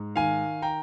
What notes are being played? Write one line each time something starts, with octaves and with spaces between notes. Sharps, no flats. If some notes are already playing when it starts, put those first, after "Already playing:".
Already playing: G#2
D#3 F5 G#5
G5 A#5